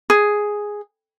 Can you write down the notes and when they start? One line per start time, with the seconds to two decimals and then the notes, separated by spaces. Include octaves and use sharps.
0.10 G#4